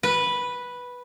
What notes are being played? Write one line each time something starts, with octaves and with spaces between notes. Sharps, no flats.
B4